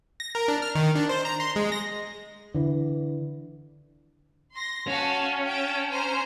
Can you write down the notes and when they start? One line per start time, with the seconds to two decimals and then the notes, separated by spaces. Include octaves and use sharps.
0.20 A#6
0.35 A#4
0.48 D4
0.62 F6
0.75 D#3
0.95 D4
1.09 C5
1.25 A#5
1.40 C6
1.56 G#3
1.72 A#6
2.54 D3 E3
4.53 C6 A#6
4.87 C#4 F#4 F5 A5
5.45 G5 A5
5.89 C5 A#5